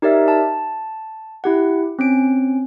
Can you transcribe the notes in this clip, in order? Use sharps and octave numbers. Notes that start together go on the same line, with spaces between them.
D#4 G4 A#4 D5 E5
A5
E4 G4 F#5
C4 C#4 D7